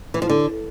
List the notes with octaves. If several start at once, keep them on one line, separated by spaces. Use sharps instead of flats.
E3
F3
D3